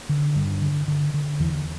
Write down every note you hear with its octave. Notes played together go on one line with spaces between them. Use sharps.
D3
G2
D3
D3
D3
E2 E3